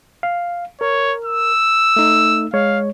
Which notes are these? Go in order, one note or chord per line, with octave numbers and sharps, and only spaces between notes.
F5
A#4 C#5
E6
A3 D#4
G#3 C#5 F5